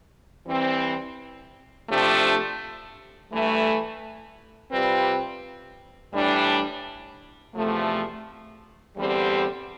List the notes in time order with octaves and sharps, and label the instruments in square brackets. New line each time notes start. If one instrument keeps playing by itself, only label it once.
[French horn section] E3 G3 C4
C3 F3 A3 D4 G4
G2 E3 A3
C3 G3 C4 F4 B4
A2 E3 G3 D4
E2 C3 F3 A3
E2 D3 G3 C4 G4